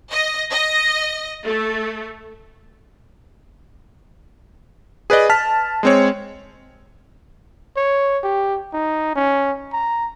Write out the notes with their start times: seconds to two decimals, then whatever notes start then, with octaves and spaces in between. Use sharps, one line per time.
0.11 D#5
0.51 D#5
1.45 A3
5.10 G#4 B4 D5 D#5
5.30 A5 F6 B6
5.83 G#3 C4 C#5
7.77 C#5
8.23 G4
8.73 D#4
9.16 C#4
9.73 A#5